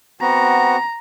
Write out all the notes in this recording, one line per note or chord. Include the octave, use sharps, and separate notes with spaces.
B3 C4 F#4 A#5